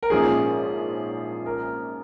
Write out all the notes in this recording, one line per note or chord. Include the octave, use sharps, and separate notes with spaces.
A#4
A#1 G#2 F3 A#3 C#4 G#4
A#4